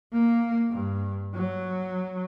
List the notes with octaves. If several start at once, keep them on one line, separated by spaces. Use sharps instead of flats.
A#3
G2
F#3